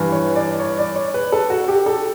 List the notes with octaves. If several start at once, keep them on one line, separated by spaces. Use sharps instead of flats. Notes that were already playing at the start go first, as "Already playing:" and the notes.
Already playing: G2 E3
C#5
D5
C#5
D5
C#5
B4
A4
F#4
G4
A4